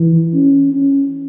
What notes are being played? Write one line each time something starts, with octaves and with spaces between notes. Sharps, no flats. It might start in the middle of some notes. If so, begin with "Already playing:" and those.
Already playing: E3
C#4
C#4